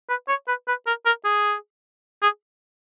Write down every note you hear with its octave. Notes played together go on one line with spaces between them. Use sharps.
B4
C#5
B4
B4
A#4
A#4
G#4
G#4